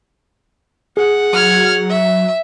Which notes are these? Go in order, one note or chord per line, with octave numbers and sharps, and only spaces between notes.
G#4 F#5
F#3 F6 G#6
E5